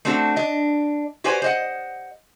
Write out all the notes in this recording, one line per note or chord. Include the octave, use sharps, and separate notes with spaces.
A3 C4 D4 F#4
D4 D#5
F#4 G4 B4 C5 D5 G#5
C5 D#5 F#5